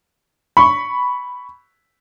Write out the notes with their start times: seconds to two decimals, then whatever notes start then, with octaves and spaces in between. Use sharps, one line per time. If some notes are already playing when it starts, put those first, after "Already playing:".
0.57 B5 C#6